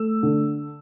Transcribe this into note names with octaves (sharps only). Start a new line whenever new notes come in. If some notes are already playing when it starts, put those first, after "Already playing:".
Already playing: A3 E6
D3